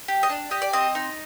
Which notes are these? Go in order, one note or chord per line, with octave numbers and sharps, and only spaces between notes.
G4
D#5
D4
G4 D#5
D5
C4 D#5
D#4